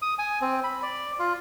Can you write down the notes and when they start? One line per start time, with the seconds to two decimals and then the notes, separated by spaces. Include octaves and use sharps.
0.02 D#6
0.19 G#5
0.41 C4
0.64 B5
0.83 D5
1.19 F4